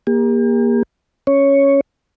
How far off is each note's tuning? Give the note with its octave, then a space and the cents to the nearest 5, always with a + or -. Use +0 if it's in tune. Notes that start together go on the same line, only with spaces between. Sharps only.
A#3 +20 G4 +45
C#4 +0 C#5 +0